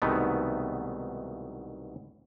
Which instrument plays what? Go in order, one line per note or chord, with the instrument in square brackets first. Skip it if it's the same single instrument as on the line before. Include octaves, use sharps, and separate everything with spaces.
[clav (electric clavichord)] C2 G#2 B2 D#3 A3 B3